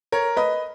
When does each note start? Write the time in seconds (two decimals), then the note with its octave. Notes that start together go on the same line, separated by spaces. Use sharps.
0.12 A#4 C#5
0.37 B4 D#5